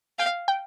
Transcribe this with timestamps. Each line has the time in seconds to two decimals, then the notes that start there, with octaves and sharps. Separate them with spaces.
0.19 F5 G5
0.48 G5